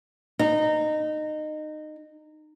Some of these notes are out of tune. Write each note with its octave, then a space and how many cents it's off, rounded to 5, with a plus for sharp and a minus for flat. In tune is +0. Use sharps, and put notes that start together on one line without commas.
D#4 -20